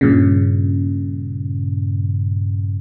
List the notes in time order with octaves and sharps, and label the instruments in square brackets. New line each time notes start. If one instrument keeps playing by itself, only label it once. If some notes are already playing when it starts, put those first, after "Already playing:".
[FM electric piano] G2 A#2 C#3